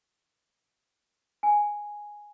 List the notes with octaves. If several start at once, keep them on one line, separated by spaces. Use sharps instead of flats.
G#5